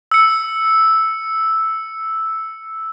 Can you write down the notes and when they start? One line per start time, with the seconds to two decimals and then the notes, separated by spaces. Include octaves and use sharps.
0.12 E6 C#7